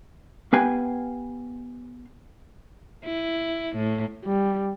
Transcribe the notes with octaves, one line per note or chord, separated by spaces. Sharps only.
B3 G4 B4 F5 G5 G#5
E4
A2
G3